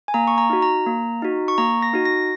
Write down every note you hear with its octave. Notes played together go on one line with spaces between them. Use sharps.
G#5
A#3 A#5
C#6
A#5
D#4 F#4
A#5
A#3
D#4 F#4
C#6
A#3 A#5
A#6
D#4 F#4
A#6